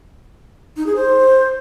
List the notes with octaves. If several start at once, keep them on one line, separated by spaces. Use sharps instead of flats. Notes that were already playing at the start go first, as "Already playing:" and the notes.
D#4
G#4
C5